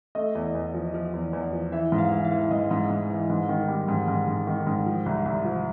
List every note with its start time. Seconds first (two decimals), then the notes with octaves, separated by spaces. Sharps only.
0.15 A3 D#5
0.35 E2
0.55 E2
0.74 F3
0.94 F3
1.14 E2
1.33 E2
1.53 F3
1.72 E3 E5
1.92 G#2
1.98 F5
2.12 E3
2.25 F5
2.32 E3
2.51 G#2 D#5
2.71 G#2
2.90 G#2
3.10 E3
3.30 G#2
3.49 D#3
3.68 G3
3.88 G#2
4.08 G#2
4.28 G#2
4.47 D#3
4.67 G#2
4.86 F3
5.06 C2
5.26 C2
5.45 F3